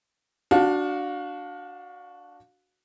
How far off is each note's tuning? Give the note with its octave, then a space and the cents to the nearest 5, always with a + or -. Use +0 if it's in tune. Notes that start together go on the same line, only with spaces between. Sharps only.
D4 +0 F#4 +0 F5 +30